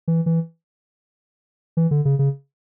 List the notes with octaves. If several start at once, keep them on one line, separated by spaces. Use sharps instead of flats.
E3
E3
E3
D3
C#3
C#3